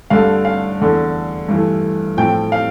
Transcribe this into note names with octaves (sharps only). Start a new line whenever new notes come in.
G2 D3 A3 F5
F5
E2 D3 A3
G2 E3 A3
A2 F3 A3 G5
F5